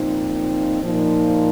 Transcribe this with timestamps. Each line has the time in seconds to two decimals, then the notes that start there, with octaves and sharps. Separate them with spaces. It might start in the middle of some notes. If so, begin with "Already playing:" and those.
Already playing: A#2 F3 C4 D#4
0.81 A#2 F3 D#4